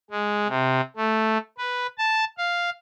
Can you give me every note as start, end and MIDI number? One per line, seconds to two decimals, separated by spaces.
0.11 0.47 56
0.48 0.81 48
0.96 1.38 57
1.58 1.87 71
1.98 2.24 81
2.38 2.70 77